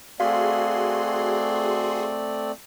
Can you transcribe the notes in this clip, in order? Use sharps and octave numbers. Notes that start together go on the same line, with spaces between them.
A3 C4 F#4 G#4 D5 F5 C6